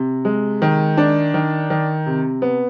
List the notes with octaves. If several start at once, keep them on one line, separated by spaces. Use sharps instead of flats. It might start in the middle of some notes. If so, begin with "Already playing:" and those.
Already playing: C3
G#3
D#3
D4
D#3
D#3
C3
B3